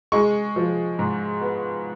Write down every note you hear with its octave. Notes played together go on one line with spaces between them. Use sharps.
G#3 C#6
F3
G#2
B3